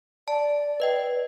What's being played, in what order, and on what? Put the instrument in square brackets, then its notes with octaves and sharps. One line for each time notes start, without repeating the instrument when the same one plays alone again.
[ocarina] D5 [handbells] A5
[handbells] B4 D#5 G5